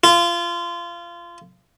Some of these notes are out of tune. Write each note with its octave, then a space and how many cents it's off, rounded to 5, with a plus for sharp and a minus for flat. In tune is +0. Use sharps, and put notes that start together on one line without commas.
F4 -25